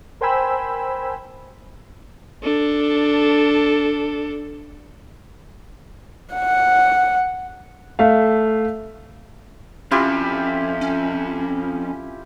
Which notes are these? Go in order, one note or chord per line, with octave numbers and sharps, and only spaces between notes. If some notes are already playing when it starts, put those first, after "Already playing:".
A#4 C5 G5 G#5 B5 E6
D4 A4
F#5
A3 E5 F5
F2 C#4 E4 F4 G4
C#4